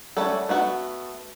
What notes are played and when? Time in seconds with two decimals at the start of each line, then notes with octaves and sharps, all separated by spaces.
0.17 G3 A3 C#4 F#4 A4
0.49 A3 B3 F#4